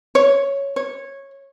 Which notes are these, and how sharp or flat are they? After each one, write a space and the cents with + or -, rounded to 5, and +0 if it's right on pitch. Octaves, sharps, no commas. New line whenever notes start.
C#5 +0
C#5 -15